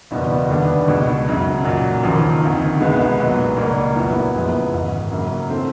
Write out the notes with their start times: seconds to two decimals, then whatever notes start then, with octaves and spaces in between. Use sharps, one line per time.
0.11 F#1 E2 B2 G3 B3
0.49 D#2 D3 G3 B3 D4
0.88 C#2 B2 G#3
1.27 F#2 C#3 F#3
1.64 B1 A#2 F#3
2.03 E1 D#2 C#3 F3 A#3
2.42 D2 C3 D#3
2.80 C2 B2 G#3 B3
3.18 B1 A#2 F#3 B3
3.57 C#2 B2 G3 A#3
3.95 A#1 A#2 F#3 B3 E4
4.35 F#2 C#3 F3 G#3 B3
4.73 A1 G#2 D#3
5.11 F#2 C#3 F#3 A#3
5.50 E3 A3 C4